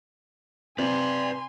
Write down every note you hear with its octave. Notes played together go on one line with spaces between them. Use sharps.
C3 B4 D5 G#5 C6